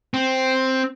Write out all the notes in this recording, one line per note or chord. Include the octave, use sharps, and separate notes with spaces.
C4